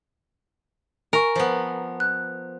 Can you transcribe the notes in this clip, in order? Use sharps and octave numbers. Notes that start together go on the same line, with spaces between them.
A#4 G#5 C#6
F3 B3
F#6